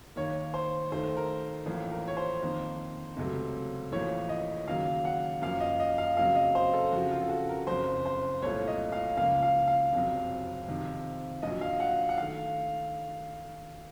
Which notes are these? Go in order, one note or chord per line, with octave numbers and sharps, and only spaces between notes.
D#2 D#3 A#3 C#5
C5
D#2 D#3 A3 C5
A#4
A1 A2 F3 A#3
A#4
C#5
C5
F2 D#3 A#3
C#2 C3 F#3 A3
A1 A2 F3 A#3 C#5
D#5
D#2 C#3 F#3 A#3 F5
F#5
F#2 F3 A#3 F5
D#5
D#5
F5
F2 C#3 F#3 A#3 F5
D#5
C5
A4
F2 C#3 F3 F#4
F4
A4
F#4
A#4
F#1 F2 C#3 C5
C5
C2 A#2 A3 C#5
D#5
F5
C#2 C#3 F3 A#3 F5
F5
F5
F#1 F2 C3 F#3
F2 C3 D#3
A#1 A#2 F#3 D#5
F5
F#5
F#5
D#3 A3 F5